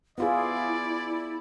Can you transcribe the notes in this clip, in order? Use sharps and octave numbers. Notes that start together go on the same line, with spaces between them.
B3 E4 F4 G#4 D5